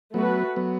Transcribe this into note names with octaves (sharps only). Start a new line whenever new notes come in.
F#3 A3 B3 F#4 B4
F#3 B3